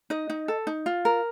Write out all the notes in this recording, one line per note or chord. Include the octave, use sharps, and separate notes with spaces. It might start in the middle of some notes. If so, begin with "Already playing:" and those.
D#4 D#5
D#4
A4
D#4
F4
A#4